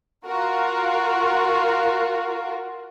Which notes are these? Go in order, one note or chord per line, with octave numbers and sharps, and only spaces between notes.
F4 F#4 A#4